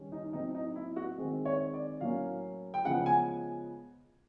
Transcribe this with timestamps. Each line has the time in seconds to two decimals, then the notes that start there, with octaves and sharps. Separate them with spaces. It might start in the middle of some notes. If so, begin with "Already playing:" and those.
Already playing: D#3 G3 C#4
0.12 D#4
0.33 A2 F#3 A3 C4 D#4
0.55 D#4
0.75 E4
0.96 F#4
1.18 D#3 G#3 C4
1.45 C#5
1.74 D5
2.01 A2 F#3 A#3 C#4 F5
2.74 G5
2.84 C#3 F3 G#3 B3 F#5
3.06 G#5